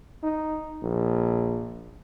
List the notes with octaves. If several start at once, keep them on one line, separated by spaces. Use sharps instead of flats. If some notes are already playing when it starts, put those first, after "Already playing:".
D#4
A#1